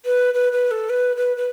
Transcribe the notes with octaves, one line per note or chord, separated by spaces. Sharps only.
B4
B4
B4
A4
B4
B4
B4